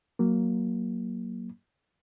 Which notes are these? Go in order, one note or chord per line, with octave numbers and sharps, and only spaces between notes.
F#3 A#3